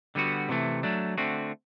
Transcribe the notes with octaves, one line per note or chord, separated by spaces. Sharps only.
D3 G3 B3 F#4
C3 E3 A3
F#3 A3 D4
D3 A3 C4 F#4